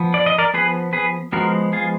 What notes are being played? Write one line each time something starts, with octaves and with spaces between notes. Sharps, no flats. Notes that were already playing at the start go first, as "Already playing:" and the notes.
Already playing: F3 B3
D5
D#5
A#4 D5
F3 B3 G#4 B4
G#4 B4
F3 G#3 B3 F#4 A#4
F4 G#4